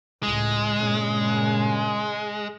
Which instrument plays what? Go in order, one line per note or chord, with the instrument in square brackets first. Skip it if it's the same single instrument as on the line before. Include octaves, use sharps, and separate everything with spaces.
[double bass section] C#2 A2 [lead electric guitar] G#3
[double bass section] G2 A#2 C#3